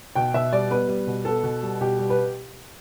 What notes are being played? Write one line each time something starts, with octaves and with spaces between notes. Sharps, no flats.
B2 G5
B2 E5
G3 D5
B3 B4
G3
B2
B3 A4
B2
G3
B2 G4
G3
B4